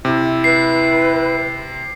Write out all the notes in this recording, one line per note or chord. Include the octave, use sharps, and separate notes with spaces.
C3 E4
B4 C7